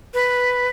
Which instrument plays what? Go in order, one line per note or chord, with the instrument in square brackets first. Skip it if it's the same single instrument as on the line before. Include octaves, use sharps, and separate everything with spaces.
[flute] B4